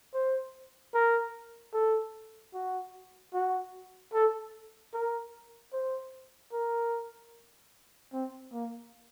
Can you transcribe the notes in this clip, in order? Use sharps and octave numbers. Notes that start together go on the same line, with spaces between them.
C5
A#4
A4
F#4
F#4
A4
A#4
C5
A#4
C4
A#3